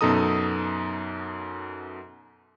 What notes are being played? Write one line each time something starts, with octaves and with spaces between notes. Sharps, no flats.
F#2 B2 D#4 A4 A#5 D#6